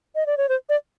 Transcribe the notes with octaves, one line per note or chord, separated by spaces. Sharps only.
D#5
D5
C#5
C5
D5